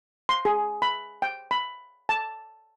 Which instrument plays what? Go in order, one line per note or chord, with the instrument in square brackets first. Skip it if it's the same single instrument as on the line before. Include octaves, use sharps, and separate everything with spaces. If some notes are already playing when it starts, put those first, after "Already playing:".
[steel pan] C6
G#4
B5
G5
B5
A5